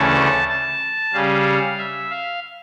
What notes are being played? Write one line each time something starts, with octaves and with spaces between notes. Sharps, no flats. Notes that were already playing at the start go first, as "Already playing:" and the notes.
Already playing: D2 C#3 E3 A3 C#4 A5
A5
C#3 G3 C#4 F5
E5
F5